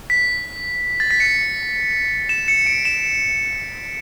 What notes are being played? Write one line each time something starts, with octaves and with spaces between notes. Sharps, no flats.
B6
A6
B6
C#7
E7
C#7
D7
E7